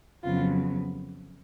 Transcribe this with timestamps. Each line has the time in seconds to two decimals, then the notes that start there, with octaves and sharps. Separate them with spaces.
0.23 F2 C#3 F#3 B3 F4